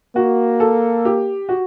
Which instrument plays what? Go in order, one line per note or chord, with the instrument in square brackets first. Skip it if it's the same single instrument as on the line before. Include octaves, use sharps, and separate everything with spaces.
[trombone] A#3 [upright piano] F#4
[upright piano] A4
G4
F#4